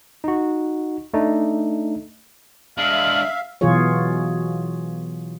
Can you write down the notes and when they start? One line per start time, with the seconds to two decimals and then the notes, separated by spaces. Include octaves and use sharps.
0.24 D#4 F#4
1.14 A3 D4 D#4
2.78 G#3 D4 E5 F5 F6 F#7
3.61 B2 E3 F#3 F4 G#4 C#5